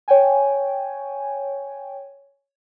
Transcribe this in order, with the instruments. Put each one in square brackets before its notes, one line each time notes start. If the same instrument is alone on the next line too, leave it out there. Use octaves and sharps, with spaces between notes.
[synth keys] C#5 G5 G#5